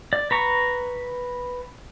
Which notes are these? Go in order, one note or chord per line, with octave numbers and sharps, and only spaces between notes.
D5
B4 A#5 C#6